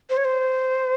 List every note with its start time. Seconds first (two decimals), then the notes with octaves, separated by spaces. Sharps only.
0.10 C5
0.17 C#5
0.25 C5